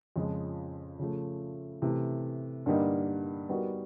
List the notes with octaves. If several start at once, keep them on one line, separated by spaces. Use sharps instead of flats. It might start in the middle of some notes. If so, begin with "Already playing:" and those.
F2 C#3 F3 G#3
C#3 F3 A3
C3 E3 A3
G2 D3 G3 A#3 D#4
G3 B3 D#4 F#4 A#4